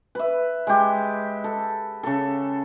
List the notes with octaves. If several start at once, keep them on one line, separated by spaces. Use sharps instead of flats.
B4 E5
G#3 G4
A4
C#3 A4